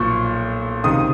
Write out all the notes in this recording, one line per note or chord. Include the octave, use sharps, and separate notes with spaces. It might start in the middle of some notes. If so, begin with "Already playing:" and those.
Already playing: B1 A#2 F3 C#6
C#2 C3 D#3 D#6